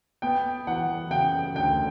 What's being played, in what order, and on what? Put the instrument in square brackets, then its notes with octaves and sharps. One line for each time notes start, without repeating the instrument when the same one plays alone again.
[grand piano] B3 [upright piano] G5
[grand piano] E3 [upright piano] F#5
[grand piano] C#3 [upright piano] G5
[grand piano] D2 [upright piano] G5